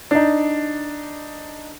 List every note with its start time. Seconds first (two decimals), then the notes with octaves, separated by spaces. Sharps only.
0.11 D4 D#4